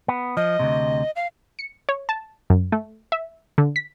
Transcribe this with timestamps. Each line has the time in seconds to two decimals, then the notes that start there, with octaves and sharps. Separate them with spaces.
0.08 B3
0.37 F3 D#5
0.59 D2 A2 C3
1.16 F5
1.59 C#7
1.89 C#5
2.09 A5
2.50 F#2
2.72 A3
3.12 E5
3.58 D3
3.76 B6